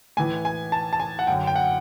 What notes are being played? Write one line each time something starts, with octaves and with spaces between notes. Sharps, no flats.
A2 E3 G#5
G#5
A5
A5
G#5
F#5
F#2 D3 G5
G5
F#5